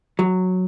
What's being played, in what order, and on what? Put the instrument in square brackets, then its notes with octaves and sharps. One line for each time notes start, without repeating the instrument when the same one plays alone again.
[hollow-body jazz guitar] F#3